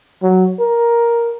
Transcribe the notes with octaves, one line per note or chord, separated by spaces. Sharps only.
F#3
A#4